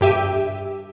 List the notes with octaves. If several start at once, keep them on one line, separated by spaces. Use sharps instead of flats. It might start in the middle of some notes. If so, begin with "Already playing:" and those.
G2 G4 E5 D#7